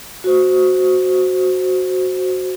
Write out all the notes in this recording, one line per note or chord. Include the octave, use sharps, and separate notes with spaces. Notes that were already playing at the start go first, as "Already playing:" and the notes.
F#4 C5